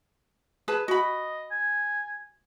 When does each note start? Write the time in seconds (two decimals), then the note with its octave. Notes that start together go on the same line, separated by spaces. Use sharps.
0.68 G#4 B4 A5
0.88 F#4 D#5 B5
1.51 G#5